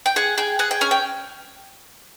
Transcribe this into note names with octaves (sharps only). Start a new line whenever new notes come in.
G5
G#4 F#5
G#4 G5
G#4 F#5
G5
C#4 G#5
G5